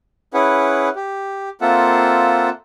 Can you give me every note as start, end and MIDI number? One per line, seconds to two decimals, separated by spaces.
0.34 0.89 61
0.34 0.89 64
0.34 0.89 68
0.34 0.89 71
0.34 0.89 78
0.96 1.49 67
1.61 2.49 58
1.61 2.49 60
1.61 2.49 65
1.61 2.49 69
1.61 2.49 76
1.61 2.49 78